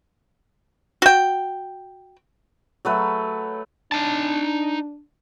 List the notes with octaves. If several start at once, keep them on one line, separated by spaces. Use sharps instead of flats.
F#4 G5
F#3 A3 B4
D4 D#4 A5